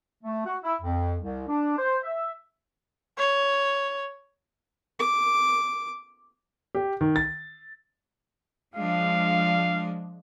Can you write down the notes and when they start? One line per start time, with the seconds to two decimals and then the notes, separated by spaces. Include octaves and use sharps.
0.24 A3
0.46 F#4
0.63 E4
0.82 F2
1.21 C2
1.49 D4
1.78 C5
2.03 E5
3.18 C#5
5.00 D6
6.75 G4
7.01 D#3
7.16 A6
8.76 F3 G#3 D4 F5